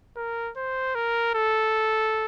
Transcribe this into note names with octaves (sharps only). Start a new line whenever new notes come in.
A#4
C5
A#4
A4